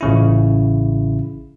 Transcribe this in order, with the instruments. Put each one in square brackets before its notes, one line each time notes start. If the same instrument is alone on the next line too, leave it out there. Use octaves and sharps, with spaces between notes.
[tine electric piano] A1 C#3 E4